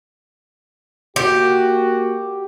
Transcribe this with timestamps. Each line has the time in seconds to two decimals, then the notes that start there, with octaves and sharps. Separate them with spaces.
1.16 A#3 F#4 G4